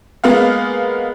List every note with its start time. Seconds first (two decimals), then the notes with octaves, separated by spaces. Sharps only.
0.24 G#3 A#3 B3 F5